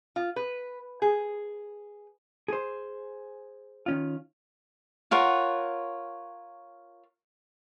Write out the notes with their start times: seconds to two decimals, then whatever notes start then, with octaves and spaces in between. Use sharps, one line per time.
0.16 F4
0.36 B4
1.02 G#4
2.48 G#4 C5
3.86 D#3 C#4 F4
5.11 F4 A#4 C#5 F#5